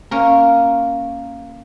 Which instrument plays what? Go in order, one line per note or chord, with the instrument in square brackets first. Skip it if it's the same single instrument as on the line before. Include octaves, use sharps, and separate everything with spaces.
[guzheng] A#3 C#4 A#4